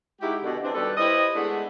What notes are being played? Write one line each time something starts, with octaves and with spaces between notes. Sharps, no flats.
G#3 D#4 E4 F#4 G4
B2 D3
E3 C4 D4
B2 D#3 G3 G4 A4 B4
E4 G4 B4 C5 D#5
G#3 A3 B3 D4 E4